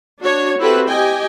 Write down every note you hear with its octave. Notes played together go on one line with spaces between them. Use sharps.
D4 F#4 C#5
C4 E4 F#4 G4 A4 B4
G4 D#5 G5 G#5